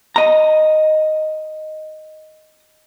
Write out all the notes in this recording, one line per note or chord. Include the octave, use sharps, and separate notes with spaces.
D#5 A#5